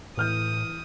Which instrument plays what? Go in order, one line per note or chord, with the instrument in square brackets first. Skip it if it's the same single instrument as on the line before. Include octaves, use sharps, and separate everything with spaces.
[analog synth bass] A2 [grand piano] E3 F6 G6 [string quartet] D#6